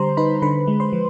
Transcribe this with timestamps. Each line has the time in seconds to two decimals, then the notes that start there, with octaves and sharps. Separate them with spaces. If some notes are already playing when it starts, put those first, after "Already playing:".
Already playing: D3 G3 C5 A#5 C6
0.17 D#4 B4 B5
0.42 D3 B4 B5
0.67 G#3
0.80 C5 C6
0.93 F3